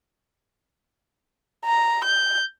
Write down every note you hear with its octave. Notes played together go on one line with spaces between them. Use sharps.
A#5
G6